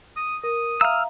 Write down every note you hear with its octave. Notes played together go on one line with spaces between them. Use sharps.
D#6
A#4 D#6
E5 F5 A#5 E6 F6